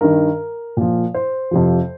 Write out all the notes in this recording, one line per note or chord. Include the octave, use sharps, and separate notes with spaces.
G2 D#3 A#4
A#2 F3
C5
F2 C3 F3